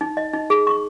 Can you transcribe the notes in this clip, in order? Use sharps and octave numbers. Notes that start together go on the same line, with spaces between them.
D#4
D#5
D#4
G#4
C#6